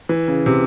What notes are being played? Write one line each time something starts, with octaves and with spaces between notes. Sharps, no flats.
E3
C#3
C3